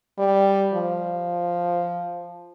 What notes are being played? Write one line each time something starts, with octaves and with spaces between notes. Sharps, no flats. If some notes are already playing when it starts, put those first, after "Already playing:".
G3
F3